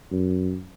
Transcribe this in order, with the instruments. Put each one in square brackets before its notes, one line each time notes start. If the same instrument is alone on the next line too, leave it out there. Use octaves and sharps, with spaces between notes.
[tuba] F#2